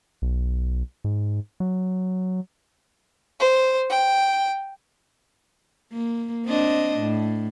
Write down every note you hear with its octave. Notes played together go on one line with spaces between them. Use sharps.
B1
G#2
F#3
C5
G5
A#3
C4 D4 D#5
A2